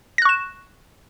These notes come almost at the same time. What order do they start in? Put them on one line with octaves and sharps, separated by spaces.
A#6 F#6 C#6 E7